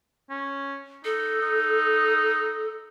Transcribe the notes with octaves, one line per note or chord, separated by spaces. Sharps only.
C#4
D#4 A4
D#4